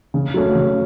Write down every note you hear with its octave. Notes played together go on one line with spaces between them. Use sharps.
C#3
F#3 A3 C#4
C#3